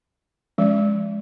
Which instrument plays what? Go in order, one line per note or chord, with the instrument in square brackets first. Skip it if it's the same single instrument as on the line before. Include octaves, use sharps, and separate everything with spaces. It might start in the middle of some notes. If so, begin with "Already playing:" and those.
[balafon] F3 G#3 C#4